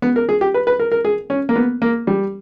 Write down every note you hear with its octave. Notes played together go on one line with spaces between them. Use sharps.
B3
A#4
G#4
G4
B4
B4
A#4
A#4
G#4
C#4
A#3
B3
A#3
G3